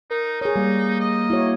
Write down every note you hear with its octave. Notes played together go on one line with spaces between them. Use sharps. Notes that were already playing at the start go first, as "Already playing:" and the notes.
D#4 A#4
D#4 G#4 C#5
G3 A#3
D#5
E4 F#4 C#5